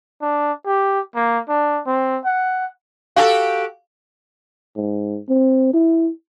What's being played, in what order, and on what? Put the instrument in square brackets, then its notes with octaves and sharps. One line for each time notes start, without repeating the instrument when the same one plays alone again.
[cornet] D4
G4
A#3
D4
C4
F#5
[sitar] F#4 G4 A4 [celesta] F5
[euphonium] G#2
C4
E4